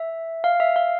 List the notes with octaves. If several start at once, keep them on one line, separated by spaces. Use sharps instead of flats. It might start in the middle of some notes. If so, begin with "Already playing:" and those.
Already playing: E5
F5
E5
F5